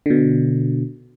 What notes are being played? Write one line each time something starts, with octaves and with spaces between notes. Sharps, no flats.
B2 D3